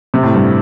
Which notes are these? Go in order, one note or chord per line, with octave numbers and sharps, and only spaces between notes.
C3
A2
G2